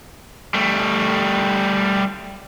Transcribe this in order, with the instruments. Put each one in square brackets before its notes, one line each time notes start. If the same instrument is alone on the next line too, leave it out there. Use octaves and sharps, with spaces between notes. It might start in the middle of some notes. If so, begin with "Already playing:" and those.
[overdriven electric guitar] G3 A3